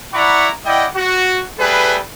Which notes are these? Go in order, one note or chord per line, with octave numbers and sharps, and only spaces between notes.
E4 D5 F#5 A#5 B5 C#6
E4 D5 D#5 F#5 G5
F#4
G3 A3 G#4 B4